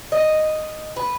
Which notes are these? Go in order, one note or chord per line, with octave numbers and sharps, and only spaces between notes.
D#5
B4